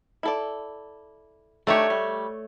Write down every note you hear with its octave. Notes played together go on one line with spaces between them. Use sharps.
E4 A4 D5
D#3 A3 D4 G4 C#5
G3